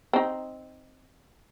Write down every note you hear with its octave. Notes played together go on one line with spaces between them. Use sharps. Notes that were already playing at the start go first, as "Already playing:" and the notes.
C4 D#4